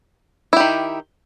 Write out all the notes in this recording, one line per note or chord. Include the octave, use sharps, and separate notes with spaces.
D#3 E4 G4